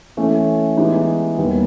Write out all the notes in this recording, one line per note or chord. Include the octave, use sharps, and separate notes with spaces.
E3 A3 C#4
E3 G#3 B3 D#4 G4
D#2 D#3 G3 B3